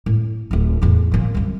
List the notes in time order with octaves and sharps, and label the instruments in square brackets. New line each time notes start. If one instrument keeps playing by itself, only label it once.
[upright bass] A2
D1 F4
E2 A2
A#2 F3
C2 F#2